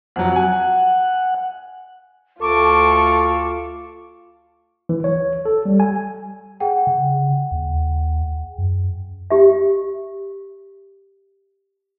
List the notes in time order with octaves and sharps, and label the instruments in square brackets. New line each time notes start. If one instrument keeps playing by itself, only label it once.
[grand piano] F2 F#3 [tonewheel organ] F#5
[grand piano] G#5
[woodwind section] D2 A5 C#6 [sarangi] F4 [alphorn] A4 [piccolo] D6
[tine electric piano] E3
C#5
A4
G3
G#5
[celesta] G#4 F#5 G5
[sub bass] C#3
D#2
F#2
[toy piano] G4 E5